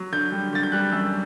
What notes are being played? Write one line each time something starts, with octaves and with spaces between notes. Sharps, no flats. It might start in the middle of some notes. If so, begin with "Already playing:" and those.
Already playing: F#3
D3 G6
G3
D3 A6
G6
G3 F#6
F#2 E6